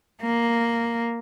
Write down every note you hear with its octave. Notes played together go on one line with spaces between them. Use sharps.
A#3